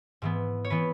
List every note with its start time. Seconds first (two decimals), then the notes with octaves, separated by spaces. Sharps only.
0.22 G#2 E3 B3
0.65 C#5
0.70 E3 B3 B4